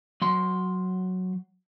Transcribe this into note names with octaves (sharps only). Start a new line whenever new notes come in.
F#3 C6